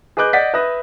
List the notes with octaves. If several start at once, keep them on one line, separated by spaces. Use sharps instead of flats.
G#4 B4 D#5 D6 F#6 G6
D5 D#5 F#5 G6 A6 B6
B4 E5 D#6 F#6 A#6